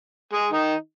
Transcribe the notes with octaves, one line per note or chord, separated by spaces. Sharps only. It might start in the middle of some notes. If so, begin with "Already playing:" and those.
G#3 G#4
D#3 D#4